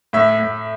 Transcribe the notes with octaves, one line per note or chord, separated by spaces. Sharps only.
A2 E5
A2